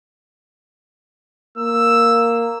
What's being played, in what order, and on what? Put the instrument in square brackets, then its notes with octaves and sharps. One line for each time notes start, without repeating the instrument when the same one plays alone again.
[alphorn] A#3 [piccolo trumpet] E6